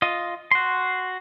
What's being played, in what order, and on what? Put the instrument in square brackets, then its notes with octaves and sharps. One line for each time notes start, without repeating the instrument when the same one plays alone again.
[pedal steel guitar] F4 D#5
F#4 C6